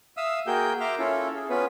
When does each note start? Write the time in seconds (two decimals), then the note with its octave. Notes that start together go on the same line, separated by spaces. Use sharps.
0.17 E5 F5 D#6 E6
0.47 A#3 F#4 G#4 A#4 G5 G6
0.80 E5 A#5 C6 D6 F6
0.98 C#4 E4 F4 A4
1.35 G#4
1.50 B3 C#4 F4 B4